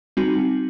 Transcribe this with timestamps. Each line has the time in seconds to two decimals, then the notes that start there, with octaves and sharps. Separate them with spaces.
0.17 G3 C4 D#4 F#4